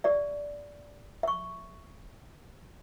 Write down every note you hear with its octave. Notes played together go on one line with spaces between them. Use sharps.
G4 D5 E5
E5 C#6